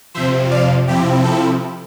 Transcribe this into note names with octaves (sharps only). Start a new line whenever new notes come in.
F2 C3 F3 C5 E5
D5 F5
C3 F3 C4 E4 G4
A4